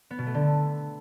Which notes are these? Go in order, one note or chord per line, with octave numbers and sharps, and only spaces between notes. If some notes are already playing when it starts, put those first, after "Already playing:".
B3
B2
A3
D3